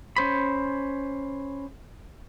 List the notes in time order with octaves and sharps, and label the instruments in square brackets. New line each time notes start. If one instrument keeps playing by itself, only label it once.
[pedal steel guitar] C#4 C5 B5